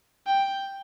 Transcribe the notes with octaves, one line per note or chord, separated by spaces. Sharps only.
G5